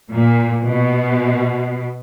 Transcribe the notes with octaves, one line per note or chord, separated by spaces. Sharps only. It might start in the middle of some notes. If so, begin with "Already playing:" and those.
A#2
B2